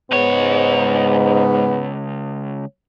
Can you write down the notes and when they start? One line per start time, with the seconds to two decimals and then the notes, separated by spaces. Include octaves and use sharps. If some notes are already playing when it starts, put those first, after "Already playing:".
0.11 C#2 G#2 B3 C#5